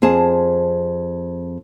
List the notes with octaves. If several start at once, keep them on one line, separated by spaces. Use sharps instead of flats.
F2 C4 G#4 A5